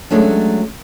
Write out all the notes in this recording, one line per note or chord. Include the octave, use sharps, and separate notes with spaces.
F#3 G#3 A3 C#4 D4